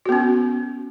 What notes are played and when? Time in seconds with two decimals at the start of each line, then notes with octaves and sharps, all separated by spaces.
0.06 F#4
0.09 B3
0.12 C#4